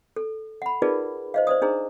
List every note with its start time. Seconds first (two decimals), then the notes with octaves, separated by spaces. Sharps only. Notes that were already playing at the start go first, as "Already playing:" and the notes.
0.16 A4
0.62 F#5 B5
0.82 D#4 F4 G#4 A#4 B4 D5
1.34 C5 D#5 F5
1.47 C5 D5 D#6
1.62 D4 D#4 G#4 C5 A#5